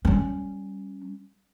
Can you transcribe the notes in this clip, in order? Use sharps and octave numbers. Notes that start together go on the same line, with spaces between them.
G3 C#4